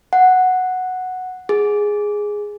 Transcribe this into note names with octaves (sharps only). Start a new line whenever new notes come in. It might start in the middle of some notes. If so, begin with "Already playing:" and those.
F#5
G#4